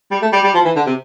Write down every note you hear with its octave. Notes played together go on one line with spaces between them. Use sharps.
G3
A3
G3
G3
F3
E3
D3
C3